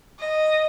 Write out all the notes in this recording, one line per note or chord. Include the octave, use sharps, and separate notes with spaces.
D#5